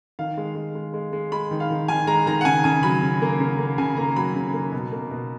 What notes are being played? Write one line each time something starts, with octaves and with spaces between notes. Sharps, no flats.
D#3 F5
G#3
G#3
G#3
G#3
G#3
G#3 B5
D#3
F5
D#3
D#3 G#5
G#3 A#5
D#3 A#5
F#5
C#3 G#5
C#3 G#5
F#3 B5
C#3
A#3
C#3
A#3
C#3 G#5
A#3 A#5
F#3 B5
C#3
A#3
B2
A#3
B2